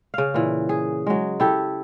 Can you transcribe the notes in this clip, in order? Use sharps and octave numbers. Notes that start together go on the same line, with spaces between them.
C#3 F5
A#2 E3
G#4
F#3 G#3
E4 G4 A4